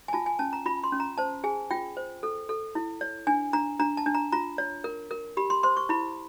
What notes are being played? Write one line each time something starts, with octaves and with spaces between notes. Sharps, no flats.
G#5
F4 A5
G#5
C#4 A5
A#5
F4 B5
C6
C#4
A#5
C5 A5
G#4 G#5
F4 G5
C5
A4
A4
E4
C#5
D4 G#5
D4 A#5
D4 A#5
A5
D4
A#5
F4 A#5
C#5
A#4
A#4
G4 B5
C6
C5 C6
C#6
E4 B5